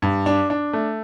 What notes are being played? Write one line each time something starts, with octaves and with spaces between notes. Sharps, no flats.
G2
D4
D4
A3